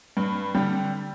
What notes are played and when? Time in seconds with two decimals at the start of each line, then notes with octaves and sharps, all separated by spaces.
0.17 G2
0.55 D3 G3